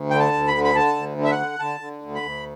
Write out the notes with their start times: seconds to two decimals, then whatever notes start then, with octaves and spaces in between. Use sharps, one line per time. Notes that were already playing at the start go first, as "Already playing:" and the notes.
Already playing: D2
0.10 D3 G5
0.20 A5
0.33 D2
0.48 B5
0.55 D3
0.65 B5
0.75 D3 A5
0.97 D2
1.18 D3
1.24 E5
1.31 F#5
1.39 D3
1.60 D3 A5
1.80 D3
2.01 D2
2.15 B5
2.22 D2